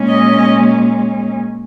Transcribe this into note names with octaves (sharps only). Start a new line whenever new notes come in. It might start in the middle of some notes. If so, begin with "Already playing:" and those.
Already playing: A#2 G#3 C#4
D#5